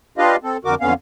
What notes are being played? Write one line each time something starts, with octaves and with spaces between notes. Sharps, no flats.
D4 F4 G4 B4 D#5 F5
C4 A4
F2 D3 F#4 A#4 D6
F2 D3 B3 C#4 F5